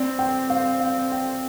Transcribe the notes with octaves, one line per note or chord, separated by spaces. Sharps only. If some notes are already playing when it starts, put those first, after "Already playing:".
Already playing: C4 D5
G5
F5
F5
G5